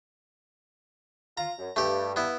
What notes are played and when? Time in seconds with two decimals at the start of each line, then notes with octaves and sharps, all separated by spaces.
1.38 F4 A#5
1.59 F#2
1.76 G2 A3 G4
2.16 B3 E4